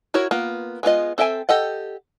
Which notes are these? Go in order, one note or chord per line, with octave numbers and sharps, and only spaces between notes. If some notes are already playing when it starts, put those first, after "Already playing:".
E4 F#4 A#4 C#5
A#3 B3 F4
G#3 B3 F4 D#5
C4 A4 E5 G5 G#5
G4 A4 D#5 F#5